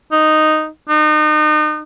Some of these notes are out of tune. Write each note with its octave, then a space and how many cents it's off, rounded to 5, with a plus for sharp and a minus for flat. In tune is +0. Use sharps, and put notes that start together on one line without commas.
D#4 -5
D#4 -35